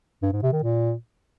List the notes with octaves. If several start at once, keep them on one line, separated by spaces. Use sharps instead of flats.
G2
G#2
C3
D#3
A#2